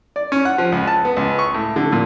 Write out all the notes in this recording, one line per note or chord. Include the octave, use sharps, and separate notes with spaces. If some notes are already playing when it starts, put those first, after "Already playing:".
D5
C#4
F#5
F3
C#2
A5
B3
C#2
C#6
A2
D3
A#2